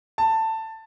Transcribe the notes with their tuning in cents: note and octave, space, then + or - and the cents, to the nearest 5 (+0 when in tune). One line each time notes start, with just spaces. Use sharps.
A5 +15